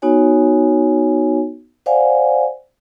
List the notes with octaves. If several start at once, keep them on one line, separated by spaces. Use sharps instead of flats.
B3 D#4 F#4 C#5 G#5
C5 D5 F5 F#5 G#5